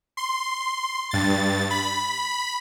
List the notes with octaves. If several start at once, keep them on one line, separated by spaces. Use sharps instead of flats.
C6
G2 A6
B5